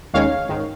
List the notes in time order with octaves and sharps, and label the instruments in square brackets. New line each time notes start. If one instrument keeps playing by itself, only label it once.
[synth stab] D#2 D#3 G#3 C#4 C#5 F5
G#2 D#3